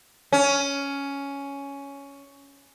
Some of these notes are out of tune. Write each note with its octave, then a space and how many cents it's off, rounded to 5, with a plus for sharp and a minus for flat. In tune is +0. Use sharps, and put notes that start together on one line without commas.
C#4 +10